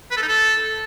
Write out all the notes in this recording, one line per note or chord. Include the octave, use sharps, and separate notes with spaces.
B4
A4
D#4
A4